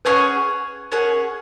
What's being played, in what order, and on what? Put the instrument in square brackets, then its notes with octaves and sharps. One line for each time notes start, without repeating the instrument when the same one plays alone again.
[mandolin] C#4 G#4 C#5 F#5 [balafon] B4
[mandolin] C#4 G#4 C#5 F#5 [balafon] A#4